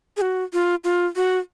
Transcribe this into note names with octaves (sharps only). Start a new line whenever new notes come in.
G#4
F#4
F4
F4
F#4